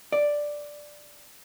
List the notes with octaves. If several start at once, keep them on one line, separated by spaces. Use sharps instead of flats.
D5